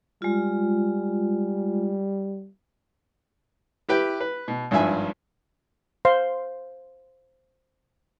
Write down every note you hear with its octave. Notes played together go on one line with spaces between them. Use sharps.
G3 G#3 F4
E4 G4 B4 G5
B4
B2
G#1 G2 F3 E5 G#5
C5 F5 C6